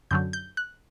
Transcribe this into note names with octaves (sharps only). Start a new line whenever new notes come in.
F#2 D3 F#3 G6
G6
F#6